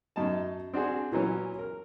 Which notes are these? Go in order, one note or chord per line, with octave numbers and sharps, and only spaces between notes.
F#2 D#4 A5
C4 D4 F#4 G#4
A#2 E3 F#3 C#4
A#4